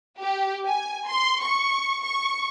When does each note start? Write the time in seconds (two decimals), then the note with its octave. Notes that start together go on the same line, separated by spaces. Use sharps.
0.20 G4
0.66 G#5
1.08 C6
1.41 C#6
2.03 C#6